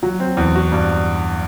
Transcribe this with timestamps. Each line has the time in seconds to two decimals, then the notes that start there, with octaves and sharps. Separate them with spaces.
0.03 F#3
0.20 C4
0.37 E2
0.55 F#4
0.72 G2